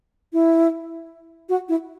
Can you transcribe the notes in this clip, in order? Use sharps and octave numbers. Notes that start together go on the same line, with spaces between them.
E4
F#4
E4